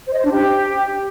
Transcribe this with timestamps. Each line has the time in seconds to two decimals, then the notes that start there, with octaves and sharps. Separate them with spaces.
0.07 C5
0.13 D#5
0.19 C5
0.25 D4
0.31 G4